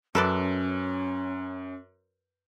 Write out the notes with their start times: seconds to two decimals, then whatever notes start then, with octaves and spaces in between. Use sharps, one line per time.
0.15 F#2 C#4 A4 B4 D5